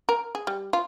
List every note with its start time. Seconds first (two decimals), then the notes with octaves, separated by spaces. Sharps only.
0.09 A#4
0.35 G#4
0.47 G3
0.73 F4